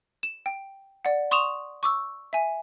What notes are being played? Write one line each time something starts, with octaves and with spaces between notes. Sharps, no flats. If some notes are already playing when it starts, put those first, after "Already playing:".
E7
G5
D5 F#5
C6 C#6 D#6 E7 F7
C#6 D6 E6
E5 G#5